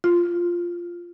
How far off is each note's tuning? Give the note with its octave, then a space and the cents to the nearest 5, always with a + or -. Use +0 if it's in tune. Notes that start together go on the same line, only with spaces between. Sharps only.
F4 -5